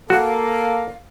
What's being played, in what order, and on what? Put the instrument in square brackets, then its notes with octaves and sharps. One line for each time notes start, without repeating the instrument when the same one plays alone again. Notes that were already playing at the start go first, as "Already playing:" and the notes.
[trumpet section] A#3 [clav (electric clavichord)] F#4 [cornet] A4 [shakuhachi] F5